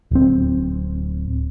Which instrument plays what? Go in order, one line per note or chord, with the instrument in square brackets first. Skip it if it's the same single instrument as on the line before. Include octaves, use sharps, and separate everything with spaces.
[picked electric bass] D1 C4